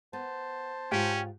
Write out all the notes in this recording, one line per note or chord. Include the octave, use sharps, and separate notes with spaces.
B3 C5 A5
G#2 C#4 F4 G4 G5